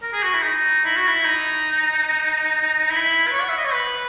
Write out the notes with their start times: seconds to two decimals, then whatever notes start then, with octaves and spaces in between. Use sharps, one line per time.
0.02 A#4
0.13 G#4
0.23 F#4
0.34 E4
0.43 D#4
0.85 E4
0.96 F#4
1.08 E4
1.26 D#4
2.91 E4
3.27 B4
3.31 C#5
3.40 F#5
3.49 E5
3.57 D#5
3.64 C#5
3.73 B4